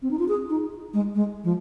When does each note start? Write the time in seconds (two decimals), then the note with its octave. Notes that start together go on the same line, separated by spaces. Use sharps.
0.02 C4
0.11 D#4
0.19 F4
0.28 G#4
0.50 D#4
0.94 G#3
1.15 G#3
1.44 F3